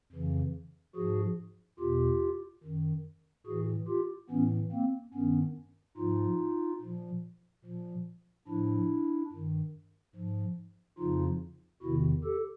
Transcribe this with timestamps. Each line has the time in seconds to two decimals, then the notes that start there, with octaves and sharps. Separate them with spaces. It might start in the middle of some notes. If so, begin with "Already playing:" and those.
0.12 F2 C#3 E3
0.96 G#2 F3 F#4 G#4
1.80 E2 B2 F4 G4
2.63 F#2 D#3
3.47 A2 E3 F#4 G#4
3.88 F4 G4
4.30 A2 E3 B3 C#4
4.72 A#3 C4
5.14 G2 D#3 B3 C#4
5.97 G#2 F3 D#4 F4
6.82 A#2 F3
7.65 A#2 F3
8.48 A2 F3 D4 E4
9.32 G2 D#3
10.15 G#2 F3
10.98 F2 C#3 F3 D#4 F4
11.82 E2 C3 D#3 E4 F#4
12.24 G4 A4